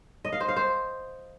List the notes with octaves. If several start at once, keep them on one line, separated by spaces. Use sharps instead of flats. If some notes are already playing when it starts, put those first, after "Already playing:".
D#5
F5
C5
F5
C5